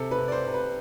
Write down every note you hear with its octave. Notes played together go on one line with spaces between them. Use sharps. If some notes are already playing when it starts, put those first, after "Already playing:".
Already playing: C3 A4
B4
C3
D5
C5
C3
B4